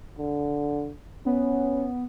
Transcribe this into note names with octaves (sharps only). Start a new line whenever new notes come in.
D3
B3 C#4